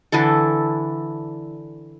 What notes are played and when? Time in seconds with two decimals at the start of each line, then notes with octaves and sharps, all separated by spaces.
0.12 D3 E3 E4 A4